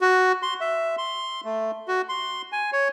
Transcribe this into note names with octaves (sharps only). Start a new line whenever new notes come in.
F#4
C6
E5
C6
A3
F#4
C6
G#5
C#5